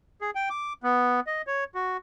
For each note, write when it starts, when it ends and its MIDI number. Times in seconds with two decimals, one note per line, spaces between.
0.21 0.30 68
0.35 0.49 79
0.50 0.73 86
0.83 1.20 59
1.27 1.42 75
1.47 1.64 73
1.75 1.97 66